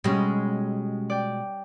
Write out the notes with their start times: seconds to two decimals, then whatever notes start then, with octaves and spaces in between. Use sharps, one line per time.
0.04 B2 G3 G#3 C#4
1.10 D5 G5